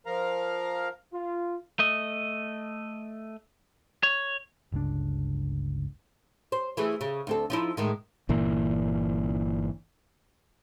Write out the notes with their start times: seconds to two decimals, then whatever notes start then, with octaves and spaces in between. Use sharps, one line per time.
0.06 F3 A#4 F5 A#5
1.12 F4
1.79 A3 D#5
4.03 C#5
4.72 G1 C#2 D4
6.52 C5
6.77 E3 A3 G#4
7.01 C#3
7.27 D2 C4 A4
7.50 F3 D#4 E4
7.77 A2 D#3 G#3
8.29 G1 A#2 E3